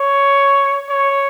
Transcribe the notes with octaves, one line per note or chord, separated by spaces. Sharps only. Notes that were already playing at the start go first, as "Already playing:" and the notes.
Already playing: C#5
C#5